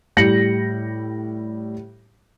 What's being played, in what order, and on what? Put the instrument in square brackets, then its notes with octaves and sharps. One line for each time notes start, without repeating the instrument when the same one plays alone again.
[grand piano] A2 G3 A#6 C#7 F#7